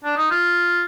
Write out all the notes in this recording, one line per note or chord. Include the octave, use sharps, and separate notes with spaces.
D4
D#4
F4